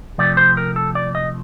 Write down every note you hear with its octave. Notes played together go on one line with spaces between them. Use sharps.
C3 F3 A3 D5
C5
A#4
A4
D5
D#5